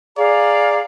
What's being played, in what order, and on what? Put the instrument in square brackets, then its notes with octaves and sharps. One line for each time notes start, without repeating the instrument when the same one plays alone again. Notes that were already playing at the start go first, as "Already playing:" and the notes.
[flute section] G#4 F5 A#5 [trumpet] D5